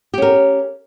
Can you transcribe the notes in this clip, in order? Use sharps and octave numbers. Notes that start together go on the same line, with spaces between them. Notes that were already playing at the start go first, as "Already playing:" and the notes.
C#4 G4 A#4